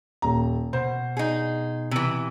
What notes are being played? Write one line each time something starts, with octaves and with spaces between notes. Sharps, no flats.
D#1 A#5
B2 C5
D#4 G#4
C3 E3